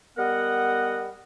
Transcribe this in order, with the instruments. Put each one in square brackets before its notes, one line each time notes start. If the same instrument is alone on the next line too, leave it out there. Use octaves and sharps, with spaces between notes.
[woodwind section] G3 B3 A#4 D#5 F#5